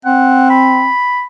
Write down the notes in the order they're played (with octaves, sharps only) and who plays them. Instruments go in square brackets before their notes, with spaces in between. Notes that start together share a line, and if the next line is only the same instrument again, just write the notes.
[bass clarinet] C4 [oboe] F#5
[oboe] B5